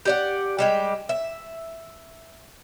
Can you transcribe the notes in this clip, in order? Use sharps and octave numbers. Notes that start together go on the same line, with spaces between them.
G4 D5 F#5
G3 G#3 G4
E5